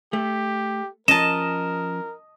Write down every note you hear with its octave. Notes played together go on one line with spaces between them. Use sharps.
A3 G4
F3 C#4 A#4 D#5 A5 E7